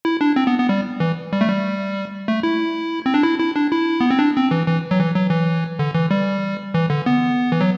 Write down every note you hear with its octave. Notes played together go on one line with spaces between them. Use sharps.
E4
D4
C4
B3
B3
G3
E3
G3
A3
G3
A3
E4
C4
D4
E4
E4
D4
E4
B3
C4
D4
C4
E3
E3
F#3
E3
F#3
E3
D3
E3
G3
E3
D3
B3
E3
F#3